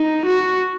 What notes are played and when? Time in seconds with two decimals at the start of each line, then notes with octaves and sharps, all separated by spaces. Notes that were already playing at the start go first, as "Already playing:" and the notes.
Already playing: D#4
0.26 F#4